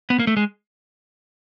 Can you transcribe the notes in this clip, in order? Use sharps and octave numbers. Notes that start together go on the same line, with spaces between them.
B3
A#3
A3
G#3